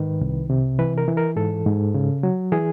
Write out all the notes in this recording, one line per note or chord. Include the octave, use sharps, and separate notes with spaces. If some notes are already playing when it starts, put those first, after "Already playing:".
Already playing: G#2 D#3 B4
C2
C3
E3 B4
A#4
E3
A#4
G#2 A4
G#2
C#3
F#3
E3 G#4